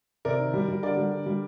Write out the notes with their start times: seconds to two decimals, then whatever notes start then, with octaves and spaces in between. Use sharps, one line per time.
0.25 C3 A#4 D5
0.39 D#3
0.54 G3
0.68 G3
0.83 D3 A#4 D5
0.97 G3
1.12 D3
1.26 G3